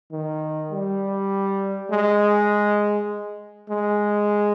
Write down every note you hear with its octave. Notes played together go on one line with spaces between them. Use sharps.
D#3
G3
G#3
G#3